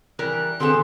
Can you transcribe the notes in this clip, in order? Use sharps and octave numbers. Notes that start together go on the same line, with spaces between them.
E3 G3 A#4 F#6
D3 B3 C4 G#4 C6 E7